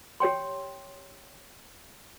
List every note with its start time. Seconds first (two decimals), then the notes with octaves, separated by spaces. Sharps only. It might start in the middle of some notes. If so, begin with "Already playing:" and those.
0.20 G4 C#5 G5 C6